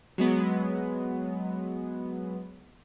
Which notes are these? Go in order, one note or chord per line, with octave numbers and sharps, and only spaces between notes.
F#3 G#3 B3